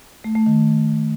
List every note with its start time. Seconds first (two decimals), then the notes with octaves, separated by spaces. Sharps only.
0.24 A3
0.35 A3
0.47 D#3